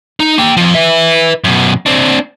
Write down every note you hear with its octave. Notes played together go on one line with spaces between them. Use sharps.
D#4
A#3 G5
F2 F3
B4 E5
F#2 B2
C4 D4